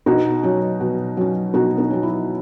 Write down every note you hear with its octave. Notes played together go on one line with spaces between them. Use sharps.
B2 D#4 F#4
F#3 C#4
B2
F#3 C#4
B2 D#4 F#4
D#4
F#3 C#4
E4